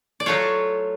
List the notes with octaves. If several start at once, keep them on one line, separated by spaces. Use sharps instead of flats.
D5
F#3 A3 F4 C#5